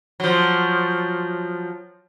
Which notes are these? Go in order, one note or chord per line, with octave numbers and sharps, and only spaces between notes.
F3 F#3